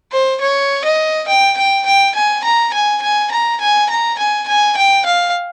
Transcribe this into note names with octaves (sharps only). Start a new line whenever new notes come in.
C5
C#5
D#5
G5
G5
G5
G#5
A#5
G#5
G#5
A#5
G#5
A#5
G#5
G#5
G5
F5